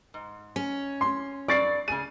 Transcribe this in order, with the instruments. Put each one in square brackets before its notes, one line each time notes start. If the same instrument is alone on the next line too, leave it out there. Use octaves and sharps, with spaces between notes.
[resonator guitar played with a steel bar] G#2
[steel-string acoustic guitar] C#4
[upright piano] C6
[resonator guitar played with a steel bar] G2 D5 [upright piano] C#6 A6 C7
[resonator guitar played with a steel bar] C#3 G#4 [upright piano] D#7